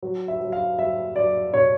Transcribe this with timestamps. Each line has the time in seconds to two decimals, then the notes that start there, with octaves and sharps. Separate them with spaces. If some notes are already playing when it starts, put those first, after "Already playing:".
0.02 F#3
0.28 E5
0.40 F#3
0.52 F5
0.78 F#3 E5
1.16 F#3 D5
1.53 B2 C#5